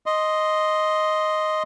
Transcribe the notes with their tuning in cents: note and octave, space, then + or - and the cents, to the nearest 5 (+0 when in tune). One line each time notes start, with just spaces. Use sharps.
D#5 +0 C6 +0